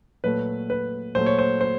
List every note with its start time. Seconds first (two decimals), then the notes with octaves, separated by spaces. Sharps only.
0.24 A#2 F#3 A3 B4
0.70 B4
1.15 A#2 F#3 A3 C5
1.26 C#5
1.39 C5
1.61 C5